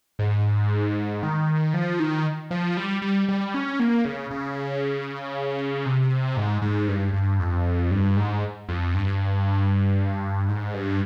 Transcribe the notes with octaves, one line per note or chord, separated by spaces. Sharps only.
G#2
D#3
F3
D#3
F3
G3
G3
G3
C#4
A#3
C#3
C#3
C3
G#2
G#2
G2
G2
F2
G2
G#2
F2
G2
G#2
G2